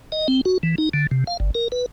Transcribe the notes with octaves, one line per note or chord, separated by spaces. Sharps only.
D#5
C4
F#4
E3
D#4
D3
C3
F5
G1
A#4
B4